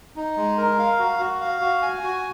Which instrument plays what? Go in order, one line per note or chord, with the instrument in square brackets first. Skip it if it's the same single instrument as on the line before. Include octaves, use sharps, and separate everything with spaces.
[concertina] D#4
G#3
A#4
F5
F#4
F#4
F5
F#4
G#5
F#4